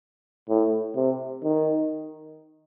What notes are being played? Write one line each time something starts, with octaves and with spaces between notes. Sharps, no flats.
A2
C3
D#3